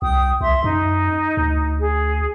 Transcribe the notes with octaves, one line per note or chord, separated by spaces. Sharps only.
C2 G5 D#6
C2 E5 C6
F#2 D#4
D2
G#4